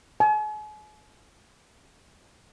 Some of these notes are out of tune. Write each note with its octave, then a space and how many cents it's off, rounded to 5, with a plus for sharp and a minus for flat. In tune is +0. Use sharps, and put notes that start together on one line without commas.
G#5 +40